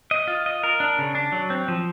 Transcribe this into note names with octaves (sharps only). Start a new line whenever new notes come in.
D#5
F4
D#5
A#4
D4
C#3
D4
F#3
C4
F3